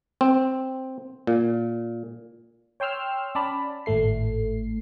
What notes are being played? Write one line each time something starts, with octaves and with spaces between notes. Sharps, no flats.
C4
A#2
C#5 G5 C6 E6 F6
C#4 D5 A5 B5
G#1 A2 A3 C7